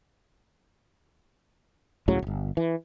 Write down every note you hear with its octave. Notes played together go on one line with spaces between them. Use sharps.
C#2 A2 C#3 F#3
D1 G1
E3